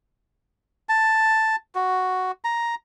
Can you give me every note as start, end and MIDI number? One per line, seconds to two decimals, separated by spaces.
0.89 1.56 81
1.75 2.32 66
2.44 2.75 82